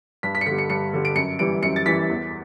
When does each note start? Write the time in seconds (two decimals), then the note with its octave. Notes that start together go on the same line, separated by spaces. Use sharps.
0.23 G2 B6
0.35 B6
0.41 C#7
0.46 D3 B6
0.51 G3
0.58 C#7
0.70 G2 C#7
0.93 D3 G3
1.05 D7
1.16 F#2 C#7
1.39 E3 G3 D7
1.63 F#2 C#7
1.76 A6
1.86 E3 G3 B6
2.10 E2